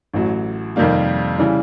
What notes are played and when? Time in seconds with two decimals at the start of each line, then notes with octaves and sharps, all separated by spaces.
0.14 A1 A2 F#3
0.76 F2 C3 D#3 G3 A#3
1.39 C#3 E3 G3